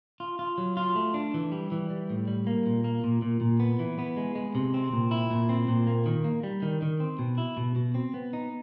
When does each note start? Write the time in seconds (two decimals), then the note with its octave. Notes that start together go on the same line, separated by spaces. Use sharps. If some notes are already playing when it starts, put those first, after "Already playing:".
0.20 F4
0.39 F4
0.58 F#3
0.77 F4
0.96 A3
1.14 D4
1.34 E3
1.52 G3
1.72 E3
1.90 G3
2.10 A2
2.28 G3
2.47 A#3
2.66 A#2
2.84 A#3
3.04 A#2
3.22 A#2
3.41 A#2
3.60 B3
3.79 E3
3.99 B3
4.17 G#3
4.35 G#3
4.55 C3
4.74 C4
4.93 A#2
5.11 E4
5.31 A#2
5.49 C4
5.68 A#2
5.87 A#3
6.06 D#3
6.24 A#3
6.43 G3
6.62 D#3
6.82 D#3
7.00 C4
7.19 B2
7.38 E4
7.57 B2
7.76 B2
7.95 C4
8.14 B3
8.33 D#4